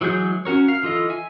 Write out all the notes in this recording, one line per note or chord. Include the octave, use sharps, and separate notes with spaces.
E3 F#3 G#3 G#4 G6
C#4 F#4 A#4 C#5
F5
E3 F4 A4 D#5
E5 G#5